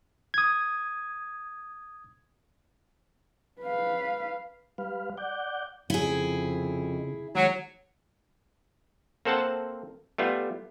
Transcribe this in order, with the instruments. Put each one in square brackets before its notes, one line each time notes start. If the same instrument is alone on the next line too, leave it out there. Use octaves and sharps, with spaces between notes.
[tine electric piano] D#6 G#6
[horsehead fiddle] B4 F5
[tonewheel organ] G3 B4 F5
D5 F#5 G6
[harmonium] F2 [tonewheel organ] C#3 [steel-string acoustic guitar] E4 G#4
[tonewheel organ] D#3 G#3 [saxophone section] F#3
[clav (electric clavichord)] A#3 C4 A4 C5 F#5 A5
G3 A3 B3 F4